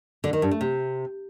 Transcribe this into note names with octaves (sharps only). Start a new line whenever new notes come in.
D3
D#3
G2
A3
C3